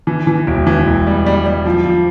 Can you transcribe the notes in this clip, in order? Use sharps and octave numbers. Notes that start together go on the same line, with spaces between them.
E3
E3
E1
E3
E1
G3
G3
G3
F3
F3